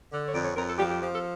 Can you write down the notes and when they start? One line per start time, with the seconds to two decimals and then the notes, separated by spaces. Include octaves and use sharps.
0.11 D3
0.29 C#5
0.33 F2 D5
0.45 C#5
0.56 F2 A#4
0.67 A4
0.78 F3 G4
0.90 G4
1.01 F3 G4
1.12 A4